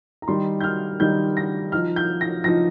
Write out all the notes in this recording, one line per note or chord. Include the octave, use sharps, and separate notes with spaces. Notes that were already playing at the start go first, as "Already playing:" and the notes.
A#5
D#3 G3 D#4 C6
G6
F6
D#3 G3 D#4 G6
A#6
F3 D#4 F6
G6
A#6
F3 D#4 A#6